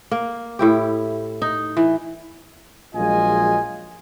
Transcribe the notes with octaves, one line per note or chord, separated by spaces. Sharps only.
A#3
A2 E4 G4
D#4
E3
A#1 F#3 G#3 F4 D#5 G#5